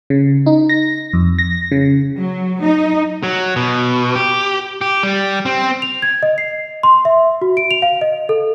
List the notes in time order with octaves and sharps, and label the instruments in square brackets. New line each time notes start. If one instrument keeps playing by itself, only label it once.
[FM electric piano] C#3
D#4
A#6
F2
A#6
C#3
[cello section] F#3
D#4
[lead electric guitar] F#3
B2
G4
G4
G3
C4
[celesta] F7
G#6
D#5
C7
C6
E5
F#4
D7
F7
F5
D#5
A4